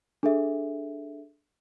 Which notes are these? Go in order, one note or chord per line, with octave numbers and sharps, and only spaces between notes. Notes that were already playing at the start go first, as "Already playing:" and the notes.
D4 G#4 A4 E5